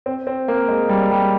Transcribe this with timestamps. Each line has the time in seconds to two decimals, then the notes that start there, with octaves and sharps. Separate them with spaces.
0.06 C4
0.27 C4
0.48 A#3
0.69 G#3
0.89 G3
1.11 G3